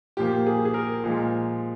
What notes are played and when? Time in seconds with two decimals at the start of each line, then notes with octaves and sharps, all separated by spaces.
0.17 A#2 F3 A#3 G4
0.46 G#4
0.65 G#4
0.74 A#4
1.04 A#2 F3 G#3